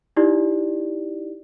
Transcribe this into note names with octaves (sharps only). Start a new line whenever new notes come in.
D#4 E4 G4 D5